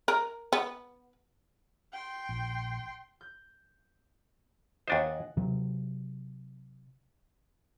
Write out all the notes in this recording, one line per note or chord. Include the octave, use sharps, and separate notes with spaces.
A#4
B3
G5 C6
A#1
G6
D#2 D4 C5 D#5 F#5 G#5
C3 F#3